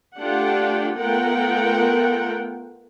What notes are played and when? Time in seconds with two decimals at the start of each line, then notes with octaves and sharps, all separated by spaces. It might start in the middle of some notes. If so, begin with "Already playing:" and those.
0.19 A3 D4 F4 G4 F#5 G5
0.96 A3 B3 F4 A#4 F#5 G5